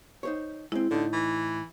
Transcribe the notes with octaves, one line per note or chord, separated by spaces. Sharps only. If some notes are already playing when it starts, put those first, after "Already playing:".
D#4 C5 C#5
G#3 C4 E4
A2 D3 D#4
E3